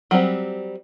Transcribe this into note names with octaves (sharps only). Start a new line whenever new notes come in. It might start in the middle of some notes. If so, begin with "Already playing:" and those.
F#3 G3 C4 G4